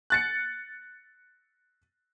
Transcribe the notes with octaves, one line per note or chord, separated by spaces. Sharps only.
F#6 A6 C#7